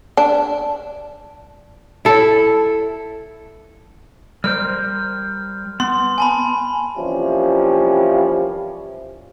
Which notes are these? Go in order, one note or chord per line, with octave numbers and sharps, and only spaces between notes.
D4
E4 A4
G3 A#4 C5 F6
B3 C6
G#5 A5 B5
C3 E3 F3 G3 A#3 C#4